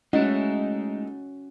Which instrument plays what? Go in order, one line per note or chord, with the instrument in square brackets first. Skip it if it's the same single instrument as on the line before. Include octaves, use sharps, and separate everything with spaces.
[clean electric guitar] G#3 A3 E4 [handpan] C#4 F#4 F#5 [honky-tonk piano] D#4